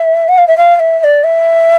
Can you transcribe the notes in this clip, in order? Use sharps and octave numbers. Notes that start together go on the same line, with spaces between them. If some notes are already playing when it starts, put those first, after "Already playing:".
Already playing: E5
F#5
F5
E5
F5
F5
E5
E5
D5
E5